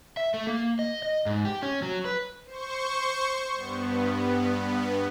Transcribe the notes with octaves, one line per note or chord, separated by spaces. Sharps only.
E5
A3
A#3
D#5
D#5
G#2
G4
C#4
F#3
B4
C5 C#6
G2 B3